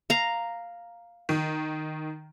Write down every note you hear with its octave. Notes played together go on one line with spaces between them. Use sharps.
F5 A#5
D#3